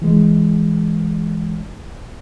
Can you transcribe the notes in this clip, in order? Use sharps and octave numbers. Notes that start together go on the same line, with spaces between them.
E3 G#3